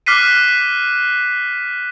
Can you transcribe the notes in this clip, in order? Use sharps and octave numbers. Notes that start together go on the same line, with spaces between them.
D6 F6 F#6 B6 C7 D#7